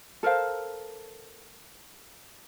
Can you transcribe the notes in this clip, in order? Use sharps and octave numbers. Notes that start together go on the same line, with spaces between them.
A4 A#4 C5 F5